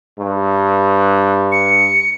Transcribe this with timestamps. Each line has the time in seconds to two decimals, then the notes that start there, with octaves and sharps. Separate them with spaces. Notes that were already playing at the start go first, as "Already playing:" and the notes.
0.19 G2
1.52 C#7